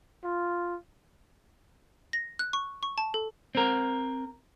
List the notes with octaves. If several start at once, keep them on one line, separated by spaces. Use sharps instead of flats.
F4
A#6
F#6
C#6
C#6
A5
A4
C4 A#4